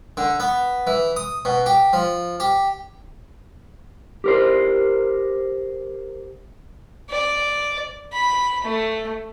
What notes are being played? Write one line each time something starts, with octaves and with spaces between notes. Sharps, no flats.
D3
B3
E3
D#6
B2
G4
F3
G4
G4 A#4 C5
D5
B5
A3